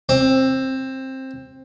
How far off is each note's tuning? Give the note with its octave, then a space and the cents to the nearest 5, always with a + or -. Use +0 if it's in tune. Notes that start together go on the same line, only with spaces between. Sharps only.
C4 +15